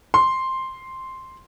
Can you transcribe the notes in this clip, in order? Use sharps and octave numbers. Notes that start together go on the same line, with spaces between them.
C6